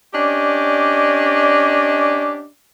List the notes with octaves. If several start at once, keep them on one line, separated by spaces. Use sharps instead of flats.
C#4 D4 G4 D5 D#5